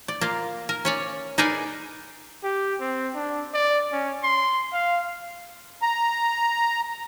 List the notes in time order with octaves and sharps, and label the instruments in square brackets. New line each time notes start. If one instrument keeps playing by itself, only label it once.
[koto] D5
A#3 F4
A#4
C#4 C#5 D5
D#4 G#4 A#4 B4 D5 G#5
[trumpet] G4
C4
D4
D5
C#4
C6
F5
[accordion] A#5